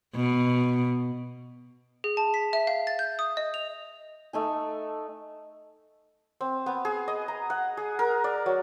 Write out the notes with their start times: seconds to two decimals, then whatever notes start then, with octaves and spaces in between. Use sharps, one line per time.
0.15 B2
2.04 G#4
2.17 A5
2.34 B6
2.53 E5
2.67 F5
2.87 A6
2.99 G6
3.19 D#6
3.37 D#5
3.54 F7
4.33 A3 D#4 G#5
6.41 C4
6.66 B3
6.85 G#4
7.08 D#5
7.28 A#5
7.50 F#5
7.77 G#4
7.99 A#4
8.24 D5
8.46 F#3